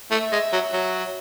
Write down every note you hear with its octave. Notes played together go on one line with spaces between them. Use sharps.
A3 E5
G#3
F#3
F#3